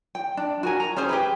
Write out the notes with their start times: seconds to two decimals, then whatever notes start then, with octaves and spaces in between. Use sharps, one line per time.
0.15 G5
0.37 D4
0.63 F#4 A#4 G#5
0.80 A#5
0.96 C#4 G#4 C5 G#5
1.09 G4 G#4 B4